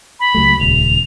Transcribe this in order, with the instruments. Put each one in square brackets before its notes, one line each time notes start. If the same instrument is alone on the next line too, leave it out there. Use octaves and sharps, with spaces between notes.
[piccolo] B5
[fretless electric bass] C#2 F#3 A3
[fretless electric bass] D#1 C#2 [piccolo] F7